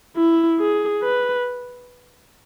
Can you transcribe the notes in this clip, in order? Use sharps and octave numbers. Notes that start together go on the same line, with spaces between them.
E4
G#4
B4